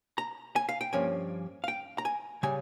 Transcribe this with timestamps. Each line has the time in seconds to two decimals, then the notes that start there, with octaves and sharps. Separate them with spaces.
0.18 A#5
0.56 G#5
0.69 F5
0.81 G5
0.93 G2 F3 A#3 C#4 G#5
1.64 F5
1.68 G5
1.98 A#5
2.05 G#5
2.43 C#3 G3 G#5